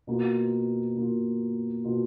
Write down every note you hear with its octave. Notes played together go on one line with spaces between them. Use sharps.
B2 A#3 F4
B2 A#3 F4
B2 A#3 F4